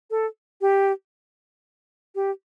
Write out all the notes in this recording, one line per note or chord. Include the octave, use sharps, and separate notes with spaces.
A4
G4
G4